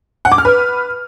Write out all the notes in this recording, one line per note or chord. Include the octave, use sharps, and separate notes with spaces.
F#5
D6
F6
B4